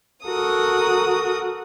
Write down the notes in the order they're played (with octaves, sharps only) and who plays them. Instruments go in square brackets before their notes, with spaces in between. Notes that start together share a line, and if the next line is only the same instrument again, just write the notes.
[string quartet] F#4 A4 A#4 D#6